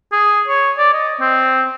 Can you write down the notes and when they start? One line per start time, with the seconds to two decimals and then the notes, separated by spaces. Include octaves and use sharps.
0.12 G#4
0.47 C#5
0.78 D5
0.94 D#5
1.20 C4